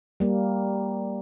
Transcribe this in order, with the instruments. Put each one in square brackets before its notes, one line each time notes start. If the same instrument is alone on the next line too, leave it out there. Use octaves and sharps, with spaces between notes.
[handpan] G3 A#3